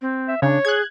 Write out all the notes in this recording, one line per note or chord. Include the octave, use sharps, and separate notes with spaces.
C4
E5
C#3 D4 C#5
G#4 F#6 G#6